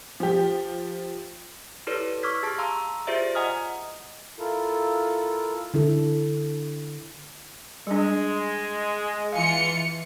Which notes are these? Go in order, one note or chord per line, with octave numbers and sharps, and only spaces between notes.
F3 G4
E4 G4 A4 B4 C#5 D5
C#6 D6 E6 F6 G#6 B6
G4 G#4 A5 C#6 F6
F5 A#5 C6 E6
F4 G4 G#4 C5 D5 E5
D#5 F#5 G#5 A#5 D#6 F6
E4 F4 A4 A#4
D3 E4 A4
G3 G#3 D4
E3 F4 F5 G#5 C#7